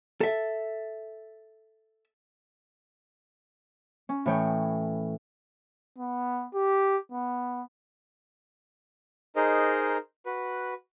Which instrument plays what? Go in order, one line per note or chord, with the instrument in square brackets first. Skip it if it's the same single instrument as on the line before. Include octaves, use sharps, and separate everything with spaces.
[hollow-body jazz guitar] A4 E5
[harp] C#4
A2 E3 C#5 G5 D#6
[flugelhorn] B3
G4
B3
[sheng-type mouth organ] D#4 G#4 A#4 C5 D#5
F#4 B4